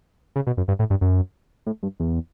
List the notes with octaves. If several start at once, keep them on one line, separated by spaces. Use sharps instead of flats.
C#3
B2
F#2
G2
A2
G2
F#2
A2
G2
E2